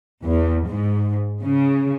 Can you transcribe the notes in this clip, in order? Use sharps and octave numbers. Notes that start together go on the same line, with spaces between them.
E2
G#2
C#3